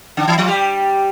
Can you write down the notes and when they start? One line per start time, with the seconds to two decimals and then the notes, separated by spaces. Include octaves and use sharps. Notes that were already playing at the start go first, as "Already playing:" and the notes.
0.17 D3 D4
0.27 E3 E4
0.38 F3 F4
0.48 G3 G4